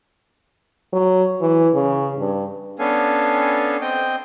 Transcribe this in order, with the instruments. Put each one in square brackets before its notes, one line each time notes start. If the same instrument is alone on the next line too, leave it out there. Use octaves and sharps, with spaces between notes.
[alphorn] F#3
E3
C#3
G2
[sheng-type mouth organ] B3 C#4 D4 A4 F5 G#5
C4 D#5 G5